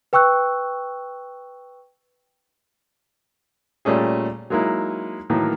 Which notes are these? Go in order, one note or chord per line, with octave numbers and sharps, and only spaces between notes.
B4 G5 C#6 E6 F#6
A#2 G3 A3 C#4 G#4
F#3 G#3 A#3 D#4 E4
A2 D#3 E3 F#3 A#3